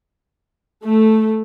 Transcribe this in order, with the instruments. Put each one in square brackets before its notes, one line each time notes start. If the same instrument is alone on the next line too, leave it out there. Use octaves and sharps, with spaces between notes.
[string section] A3